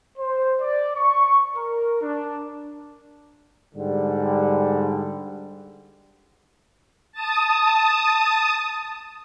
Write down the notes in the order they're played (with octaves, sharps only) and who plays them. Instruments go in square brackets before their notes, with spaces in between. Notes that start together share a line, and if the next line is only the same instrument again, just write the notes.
[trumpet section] C5
D5
C#6
A#4
D4
[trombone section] G#2 D3 G3
[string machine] A5 D#6